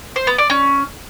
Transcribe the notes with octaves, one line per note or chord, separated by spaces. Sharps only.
C5
B3
D5
C#4